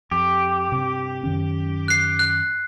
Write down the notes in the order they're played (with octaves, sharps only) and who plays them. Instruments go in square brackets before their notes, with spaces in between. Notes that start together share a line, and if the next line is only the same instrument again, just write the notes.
[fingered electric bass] F2 [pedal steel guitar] G4
[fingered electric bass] G2 C3
F#2 D#3 C#4
[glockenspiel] F#6 C7
F#6